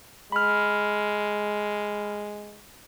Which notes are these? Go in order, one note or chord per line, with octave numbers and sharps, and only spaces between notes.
G#3 B5 F6